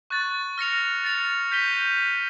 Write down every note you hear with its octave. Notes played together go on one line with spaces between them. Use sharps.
C#6 F#6 A6
F6 A#6 C#7 F7
A6 C#7 F7
G6 B6 D#7 G7